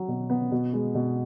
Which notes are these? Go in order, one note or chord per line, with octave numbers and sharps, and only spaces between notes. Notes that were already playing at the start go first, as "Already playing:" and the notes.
Already playing: F#3 F#4
B2
B3
B2
G#3
B2